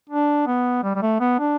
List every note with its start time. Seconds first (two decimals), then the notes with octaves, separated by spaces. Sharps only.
0.10 D4
0.47 B3
0.83 G3
0.95 G3
1.02 A3
1.20 B3
1.39 D4